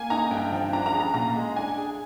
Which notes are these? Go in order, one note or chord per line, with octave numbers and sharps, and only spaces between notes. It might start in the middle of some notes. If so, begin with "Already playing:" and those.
Already playing: A#3 G#5
D#4 A#5
G2 G5
F3
D4 A#5
A#5
G#4
A#5
A#2 A#5
G#3
D4 G#5
G#4